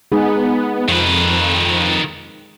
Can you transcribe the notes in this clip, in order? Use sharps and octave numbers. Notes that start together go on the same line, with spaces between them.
G#3 B3 D#4 G#4
F2 D#3 B4